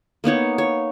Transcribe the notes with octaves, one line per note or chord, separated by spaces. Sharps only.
A#3 B3 D#4 C#5
C#5